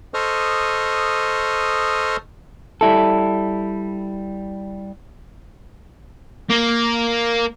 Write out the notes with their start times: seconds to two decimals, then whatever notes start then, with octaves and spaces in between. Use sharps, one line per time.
0.14 A4 C5 D#5 C#6 D#6 F6
2.81 G3 E4 A4
6.50 A#3